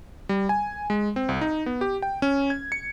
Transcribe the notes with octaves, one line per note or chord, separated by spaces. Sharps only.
G3
G#5
G#3
C4
C2
D#4
B3
G4
G5
C#4
G#6
C#7